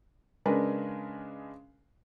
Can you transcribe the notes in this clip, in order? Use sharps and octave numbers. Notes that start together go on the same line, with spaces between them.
C#3 G#3 D4 A#4 B4